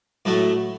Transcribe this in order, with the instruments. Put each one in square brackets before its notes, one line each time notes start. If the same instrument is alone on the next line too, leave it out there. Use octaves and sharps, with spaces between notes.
[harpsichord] A2 F#3 A3